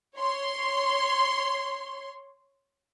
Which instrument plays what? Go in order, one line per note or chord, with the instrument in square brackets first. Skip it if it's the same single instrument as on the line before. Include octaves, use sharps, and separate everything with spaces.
[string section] C#5 C6